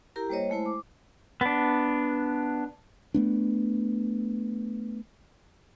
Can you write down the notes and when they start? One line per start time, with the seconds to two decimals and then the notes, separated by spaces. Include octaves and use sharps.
0.16 E4 G4 A#4 A#5
0.29 G3 A#3 C5 C#5 D#5
0.50 G#3 A3 E4 C5
0.66 D6
1.41 B3 D4
3.14 A3 B3 D4